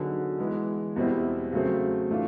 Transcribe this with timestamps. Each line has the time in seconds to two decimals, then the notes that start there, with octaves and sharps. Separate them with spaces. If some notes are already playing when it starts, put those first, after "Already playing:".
Already playing: D3 F#3 B3 D#4 G#4
0.38 E3 G#3 B3
0.96 E2 B2 G3 C4 E4
1.53 C#3 F#3 A3 C4
2.09 A2 E3 A3 D4 F4